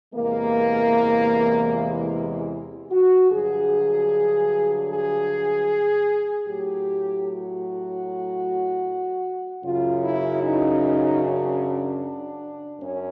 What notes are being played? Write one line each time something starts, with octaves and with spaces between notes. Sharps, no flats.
E2 C3 E3 G#3 A#3
E4
F#4
G2 D3 F#3 G#4
G#4
A2 F#3 G4
F#4
F#2 C#3 F#3 F4
E4
D#4
D4
F#2 C#4